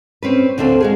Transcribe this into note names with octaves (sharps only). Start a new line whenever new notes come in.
C4 C#4 B4
D2 C4 D4 A4 F5
G#3 F#4 G#4